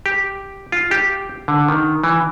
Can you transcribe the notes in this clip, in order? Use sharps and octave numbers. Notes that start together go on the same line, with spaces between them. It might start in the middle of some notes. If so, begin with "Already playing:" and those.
G4
F4
G4
D3
D#3
E3